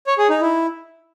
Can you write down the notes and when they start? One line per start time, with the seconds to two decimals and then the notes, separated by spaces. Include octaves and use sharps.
0.07 C#5
0.18 G#4
0.30 D#4
0.41 E4